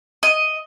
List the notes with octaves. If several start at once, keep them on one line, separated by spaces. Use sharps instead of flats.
D#5